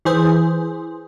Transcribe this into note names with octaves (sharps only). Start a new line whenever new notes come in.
E3 G#4 C5